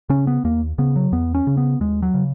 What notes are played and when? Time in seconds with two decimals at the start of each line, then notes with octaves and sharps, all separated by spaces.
0.10 C#3 C#4
0.27 B3
0.44 D#2 A#3
0.78 C#3 B3
0.96 F#3
1.12 E2 B3
1.35 C#4
1.47 C#3
1.57 B3
1.80 D#2 G#3
2.03 F#3
2.14 C#3